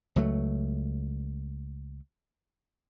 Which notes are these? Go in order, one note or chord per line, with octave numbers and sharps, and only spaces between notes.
C#2 F#3 A3